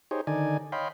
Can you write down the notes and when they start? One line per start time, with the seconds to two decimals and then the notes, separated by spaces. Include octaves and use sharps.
0.11 D#4 G4 G#4 C5 C#5
0.27 D3 D#3 D#4 D5 G#5
0.72 C#5 D#5 F5 G5 B5 C6